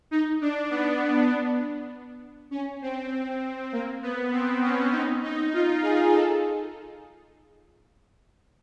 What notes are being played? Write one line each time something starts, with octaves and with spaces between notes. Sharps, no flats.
D#4
D4
B3
C#4
C4
A#3
B3
C4
C#4
D#4
D#4
F4
G#4
A4